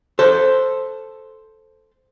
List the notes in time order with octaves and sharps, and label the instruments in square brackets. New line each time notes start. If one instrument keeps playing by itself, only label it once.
[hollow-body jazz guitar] A4 C5